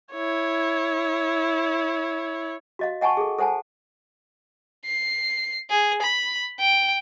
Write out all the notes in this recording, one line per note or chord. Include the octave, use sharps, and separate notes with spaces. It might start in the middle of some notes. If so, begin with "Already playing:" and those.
E4 C#5
F#4 D#5 F5
D#5 F#5 G#5 A5 C#6
G#4 A4
A4 C5 F#5 G#5 A5
C7
G#4
B5
G5